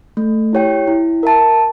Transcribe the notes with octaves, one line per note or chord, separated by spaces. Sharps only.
A3
E4 G4 C#5 G5
E4
A#4 E5 A5